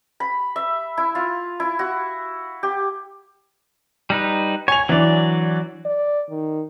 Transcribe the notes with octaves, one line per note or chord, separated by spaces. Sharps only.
B5
E5
E4
F4
E4
F#4
G4
G3 D#4 B4
C#5 G#5 F7
E3 F#3 D4 D5
D5
D#3